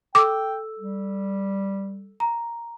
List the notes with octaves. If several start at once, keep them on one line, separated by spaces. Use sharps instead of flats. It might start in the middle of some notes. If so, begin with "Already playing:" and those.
A4 G5 D6 E6
G3
A#5